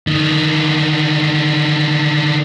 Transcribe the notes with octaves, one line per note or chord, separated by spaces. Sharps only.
D3 D#3